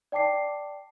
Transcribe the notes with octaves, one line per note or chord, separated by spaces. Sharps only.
D5 G5 A5 D6 C7